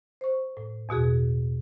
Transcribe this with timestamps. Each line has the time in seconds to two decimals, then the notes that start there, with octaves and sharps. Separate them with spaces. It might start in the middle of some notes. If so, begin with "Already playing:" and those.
0.21 C5 C#6
0.57 A2
0.89 E2 B2 F#4 G#4